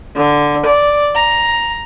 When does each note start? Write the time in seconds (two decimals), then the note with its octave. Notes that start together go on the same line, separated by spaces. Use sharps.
0.15 D3
0.65 D5
1.14 A#5